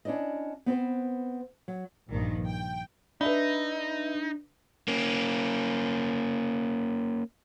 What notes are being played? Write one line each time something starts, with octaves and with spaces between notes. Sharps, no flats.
C#4 D4 E4 D5 D#5
B3 C4 B4 C5
F#3
A#1 G2 D#3 F3
G5
D4 D#4 B4 E5 B5
A#3 C#4